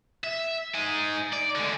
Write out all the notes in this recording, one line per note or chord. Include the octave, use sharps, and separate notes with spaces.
E5
D#4 G#5
D5
D3 G#3